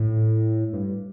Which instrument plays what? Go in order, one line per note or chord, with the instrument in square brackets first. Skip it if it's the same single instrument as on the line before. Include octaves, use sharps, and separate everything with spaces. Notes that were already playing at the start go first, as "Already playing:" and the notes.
Already playing: [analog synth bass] A2
G2